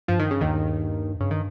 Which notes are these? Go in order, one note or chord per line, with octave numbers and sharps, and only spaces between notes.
G2 F3
D#3
C#3
D#2 D#3
G2 C#3
D#3